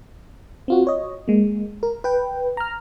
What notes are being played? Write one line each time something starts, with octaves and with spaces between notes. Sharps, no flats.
C4 F4 F#4
C#5 D#5
G#3 A#3
A#4
B4 G5
A#5 F6